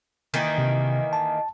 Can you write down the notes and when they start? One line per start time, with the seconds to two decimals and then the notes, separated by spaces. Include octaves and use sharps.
0.34 D#3 E3 A#3
0.58 C3
1.13 A5